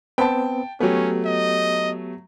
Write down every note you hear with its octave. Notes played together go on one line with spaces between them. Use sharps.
B3 C4 B4 G5 A5
F#3 A3 B3 C#4 G4
D#5